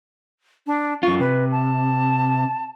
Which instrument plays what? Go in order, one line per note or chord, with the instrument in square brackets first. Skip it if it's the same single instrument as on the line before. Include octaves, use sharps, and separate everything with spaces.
[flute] D4
[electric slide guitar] F#2 F4 [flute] C#6
[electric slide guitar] C3 [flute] B4
[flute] A5